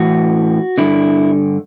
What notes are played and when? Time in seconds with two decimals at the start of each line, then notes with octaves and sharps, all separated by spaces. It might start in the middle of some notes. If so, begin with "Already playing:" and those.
Already playing: A2 E3 F#4
0.78 G2 D3 E4